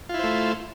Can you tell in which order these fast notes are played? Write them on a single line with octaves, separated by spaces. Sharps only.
F4 E4 C5 A3